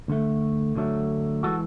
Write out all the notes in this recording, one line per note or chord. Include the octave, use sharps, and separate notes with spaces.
D2 D3 A3
D2 D3 F#3 A3
E3 G#3 F#4 A4